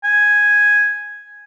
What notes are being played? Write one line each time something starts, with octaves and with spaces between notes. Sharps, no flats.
G#5